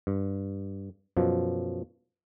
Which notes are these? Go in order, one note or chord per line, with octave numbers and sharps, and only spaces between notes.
G2
F#2 B2 F3